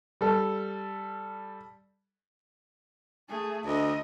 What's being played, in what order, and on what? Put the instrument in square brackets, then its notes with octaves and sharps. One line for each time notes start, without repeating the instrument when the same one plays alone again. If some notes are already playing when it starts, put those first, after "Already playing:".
[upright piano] G3 A4
[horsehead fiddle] A3 G#4
[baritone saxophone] D2 [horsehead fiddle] D#5